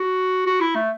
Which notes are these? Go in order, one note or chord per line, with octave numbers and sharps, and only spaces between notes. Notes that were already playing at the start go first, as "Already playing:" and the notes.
Already playing: F#4
F#4
E4
A3